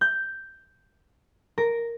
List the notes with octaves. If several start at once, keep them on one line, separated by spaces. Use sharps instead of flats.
G6
A#4